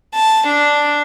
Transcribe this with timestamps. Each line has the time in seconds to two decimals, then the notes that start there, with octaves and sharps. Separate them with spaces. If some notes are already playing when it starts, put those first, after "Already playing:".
0.15 A5
0.46 D4